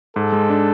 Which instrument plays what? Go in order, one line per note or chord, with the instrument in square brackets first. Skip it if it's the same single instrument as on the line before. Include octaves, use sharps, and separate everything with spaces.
[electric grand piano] G#2 [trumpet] A4
[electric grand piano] G#3
D4